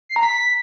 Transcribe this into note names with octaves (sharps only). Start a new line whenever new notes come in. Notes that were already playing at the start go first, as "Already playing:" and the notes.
C7
A#5
B6